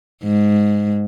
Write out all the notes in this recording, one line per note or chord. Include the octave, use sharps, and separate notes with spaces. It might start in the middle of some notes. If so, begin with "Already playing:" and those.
G#2